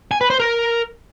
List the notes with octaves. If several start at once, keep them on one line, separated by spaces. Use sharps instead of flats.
G#5
B4
C5
A#4